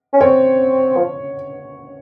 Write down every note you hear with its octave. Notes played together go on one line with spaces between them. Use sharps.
C#4
C4 C#5
F3